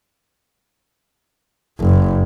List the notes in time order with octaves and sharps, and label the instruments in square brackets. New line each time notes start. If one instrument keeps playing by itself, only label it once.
[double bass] F#1